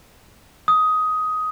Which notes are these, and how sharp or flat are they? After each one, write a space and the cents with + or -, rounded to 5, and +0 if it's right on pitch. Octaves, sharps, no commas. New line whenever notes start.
D#6 +15